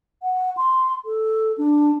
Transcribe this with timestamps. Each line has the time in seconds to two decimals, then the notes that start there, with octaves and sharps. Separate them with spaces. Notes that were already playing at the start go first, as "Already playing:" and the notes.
0.23 F#5
0.57 C6
1.05 A4
1.58 D4